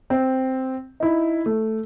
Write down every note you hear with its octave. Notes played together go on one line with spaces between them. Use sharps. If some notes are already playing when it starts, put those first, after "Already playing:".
C4
D#4 E4
A3